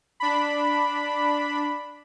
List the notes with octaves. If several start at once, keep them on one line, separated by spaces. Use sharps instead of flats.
D4 B5